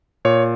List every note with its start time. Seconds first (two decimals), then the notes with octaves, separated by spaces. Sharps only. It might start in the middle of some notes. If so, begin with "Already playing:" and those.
0.25 A#2 C#5